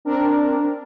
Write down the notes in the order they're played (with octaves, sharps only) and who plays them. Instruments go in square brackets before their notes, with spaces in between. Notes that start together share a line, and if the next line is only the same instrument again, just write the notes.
[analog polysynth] C4 D4 A#4